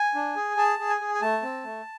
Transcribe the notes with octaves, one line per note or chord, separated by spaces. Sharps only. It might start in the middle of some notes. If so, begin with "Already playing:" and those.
Already playing: G#5
D4
G#4
G#4 A5
G#4
G#5
G#4
G#5
A3 A5
C4
A3